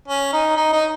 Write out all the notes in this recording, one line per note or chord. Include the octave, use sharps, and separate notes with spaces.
C#4
D#4
D#4
D#4